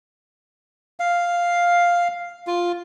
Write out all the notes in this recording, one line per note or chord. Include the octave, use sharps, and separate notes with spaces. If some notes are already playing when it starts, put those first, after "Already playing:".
F5
F4